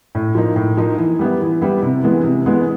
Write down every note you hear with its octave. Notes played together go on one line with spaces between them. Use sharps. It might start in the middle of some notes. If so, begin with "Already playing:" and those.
A2
F3 A#3 D#4
A2
F3 A#3 D#4
E3
G3 B3 E4
E3
G3 B3 E4
C3
E3 G#3 B3
C3
E3 G#3 B3